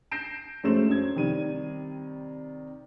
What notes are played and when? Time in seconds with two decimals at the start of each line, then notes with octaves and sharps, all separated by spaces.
0.11 G6 A#6 C7 D7 E7
0.63 F#2 G#3 A3 C5 E7
0.89 F#2 G#6
1.16 C3 D#3 G3 D#7